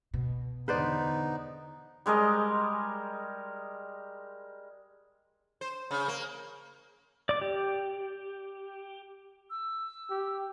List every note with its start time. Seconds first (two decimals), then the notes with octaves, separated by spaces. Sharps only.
0.14 B2
0.68 E2 D3 B3 D#4 B4 C5 D5
2.06 G3 G#3 A#4 D#5
5.61 C5
5.91 C#3
6.08 A#3
7.29 D5 D6
7.42 G4
9.50 E6
10.10 G4